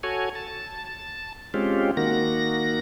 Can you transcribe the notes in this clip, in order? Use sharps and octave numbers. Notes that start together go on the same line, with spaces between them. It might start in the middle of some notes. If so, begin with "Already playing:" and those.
F#4 A4 C#5 G#5
A5
G#3 C4 C#4 F4 G4
D#3 A#3 F#4 A#6